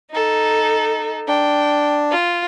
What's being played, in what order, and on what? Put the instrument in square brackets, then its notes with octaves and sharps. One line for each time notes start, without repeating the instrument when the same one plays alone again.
[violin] D#4 A4
[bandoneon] D4 [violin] G5
[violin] F4